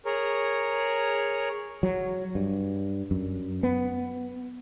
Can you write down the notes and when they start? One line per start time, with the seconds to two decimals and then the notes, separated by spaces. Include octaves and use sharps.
0.05 G#4 A#4 C#5
1.83 F#3
2.35 G2
3.11 F#2
3.63 B3